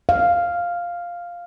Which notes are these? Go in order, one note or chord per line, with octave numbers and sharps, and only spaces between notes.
F5